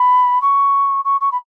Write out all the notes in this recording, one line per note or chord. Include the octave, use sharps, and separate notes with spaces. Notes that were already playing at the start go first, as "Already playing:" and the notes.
Already playing: B5
C#6
C#6
C#6
B5